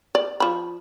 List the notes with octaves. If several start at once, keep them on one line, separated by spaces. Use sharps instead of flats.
D5
F3 B5